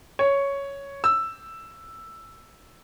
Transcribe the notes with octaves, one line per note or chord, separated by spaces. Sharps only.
C#5
E6